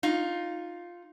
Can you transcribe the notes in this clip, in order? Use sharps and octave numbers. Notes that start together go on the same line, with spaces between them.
D#4 F4